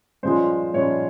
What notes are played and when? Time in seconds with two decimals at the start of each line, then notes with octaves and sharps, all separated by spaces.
0.23 G2 F3 G#3 C#4 F4 C5
0.74 G2 F3 G#3 C#4 F4 C#5